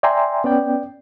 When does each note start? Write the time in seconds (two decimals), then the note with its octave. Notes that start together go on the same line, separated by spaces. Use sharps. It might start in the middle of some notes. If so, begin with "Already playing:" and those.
0.03 D5 E5 G5 G#5 A#5 C6
0.44 B3 C#4 D5 G5